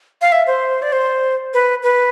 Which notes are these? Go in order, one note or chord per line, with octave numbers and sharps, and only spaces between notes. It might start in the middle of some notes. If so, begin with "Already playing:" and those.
F5
E5
C5
D5
C5
B4
B4